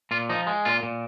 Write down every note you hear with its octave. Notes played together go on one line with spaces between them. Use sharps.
A#2 F4
F3 D#4
G#3
A#2 F4
A#2